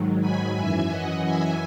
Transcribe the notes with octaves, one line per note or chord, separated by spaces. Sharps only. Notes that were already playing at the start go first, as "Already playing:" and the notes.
Already playing: G#2 D#3 F#3
G#5 B5
F#2 E3 E5 G#5
D#5 F#5
E5 G#5